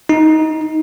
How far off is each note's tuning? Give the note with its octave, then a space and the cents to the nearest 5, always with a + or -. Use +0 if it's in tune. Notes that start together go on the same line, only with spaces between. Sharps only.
D#4 +15